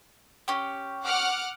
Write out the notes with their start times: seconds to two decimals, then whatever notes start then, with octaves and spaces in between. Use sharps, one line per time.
0.48 C#4 G4
1.03 F#5 D6 F6